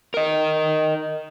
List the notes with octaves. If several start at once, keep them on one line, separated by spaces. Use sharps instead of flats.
A#4 D#5